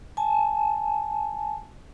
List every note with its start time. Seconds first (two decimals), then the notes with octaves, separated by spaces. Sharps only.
0.17 G#5 A5